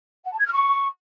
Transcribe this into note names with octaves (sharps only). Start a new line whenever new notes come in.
F#5
A5
G#6
F6
C#6